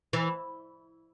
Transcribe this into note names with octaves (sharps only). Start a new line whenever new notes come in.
E3